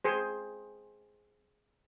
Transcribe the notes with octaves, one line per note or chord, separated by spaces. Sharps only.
G#4 C5